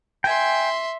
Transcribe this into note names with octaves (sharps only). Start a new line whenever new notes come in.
E5 G5 G#5 C6